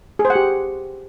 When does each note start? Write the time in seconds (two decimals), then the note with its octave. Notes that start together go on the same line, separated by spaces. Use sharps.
0.19 G#4
0.25 C5
0.30 F#5
0.35 G4